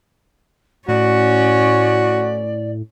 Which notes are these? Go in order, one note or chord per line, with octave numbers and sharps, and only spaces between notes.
A2 C#4 F#4 D5